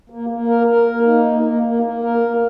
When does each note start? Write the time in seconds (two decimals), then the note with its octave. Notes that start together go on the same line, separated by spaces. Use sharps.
0.10 A#3
0.29 A#3
0.48 A#4
0.67 A#4
0.86 A#3
1.05 D#4
1.25 A#3
1.43 A#3
1.63 A#3
1.83 A#3
2.01 A#4
2.20 A#3